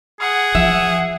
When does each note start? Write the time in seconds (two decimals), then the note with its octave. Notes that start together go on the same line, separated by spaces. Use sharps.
0.20 G#4 F#5
0.55 F3 E5